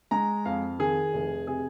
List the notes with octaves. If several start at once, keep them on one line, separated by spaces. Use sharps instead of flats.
G#3 A#5
F2 F5
D#3 G#4
F1
C3 G#4